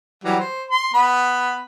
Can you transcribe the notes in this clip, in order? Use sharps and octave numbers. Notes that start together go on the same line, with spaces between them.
E3 F#3 G3
C5
C6
B3 B5